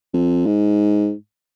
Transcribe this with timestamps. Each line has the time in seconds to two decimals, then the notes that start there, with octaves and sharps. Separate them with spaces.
0.14 F2
0.46 G#2